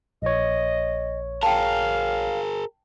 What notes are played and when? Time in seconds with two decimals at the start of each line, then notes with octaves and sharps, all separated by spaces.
0.22 A#1 C#5 D#5
1.43 G#4 A#4 F5 G5 A5